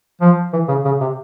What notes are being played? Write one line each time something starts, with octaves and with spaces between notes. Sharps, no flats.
F3
E3
C#3
C#3
C3